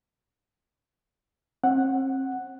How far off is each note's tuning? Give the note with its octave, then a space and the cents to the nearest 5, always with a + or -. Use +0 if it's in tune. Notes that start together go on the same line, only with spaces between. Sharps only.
C4 +40 F#5 +0